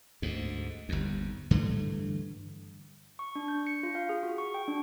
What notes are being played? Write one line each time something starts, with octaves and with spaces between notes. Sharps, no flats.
D2 G#2
G1 D#2
G2 D3 E3 A3
C#6
D4
G6
C#7
F4
F5
G#4
F#4
C#6
G5
D4